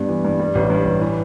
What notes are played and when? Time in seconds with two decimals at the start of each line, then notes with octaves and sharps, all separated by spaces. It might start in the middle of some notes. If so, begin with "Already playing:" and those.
Already playing: G2 B3
0.09 E3
0.25 G2
0.39 G3
0.55 A1
0.70 G2
0.85 A1
1.01 E3